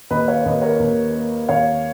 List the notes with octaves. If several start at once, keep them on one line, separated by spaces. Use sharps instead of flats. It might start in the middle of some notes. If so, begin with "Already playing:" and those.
D#2 B4 D#5
C#5 F5
D#2 B4 D#5
A#4 C#5
D#2
A#3
D#2 C#5 F5